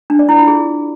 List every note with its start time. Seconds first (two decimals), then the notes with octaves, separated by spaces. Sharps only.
0.10 D4
0.19 D5
0.29 E4
0.38 F4
0.47 G#4